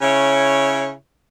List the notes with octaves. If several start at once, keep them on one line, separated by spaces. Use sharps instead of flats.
C#3 E4 C#5